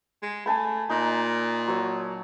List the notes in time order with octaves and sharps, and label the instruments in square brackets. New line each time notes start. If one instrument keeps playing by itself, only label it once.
[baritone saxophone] G#3
[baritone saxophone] A3 [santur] G#5 A5 B5
[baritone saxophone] A#2 [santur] D#4
[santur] F#3 C#5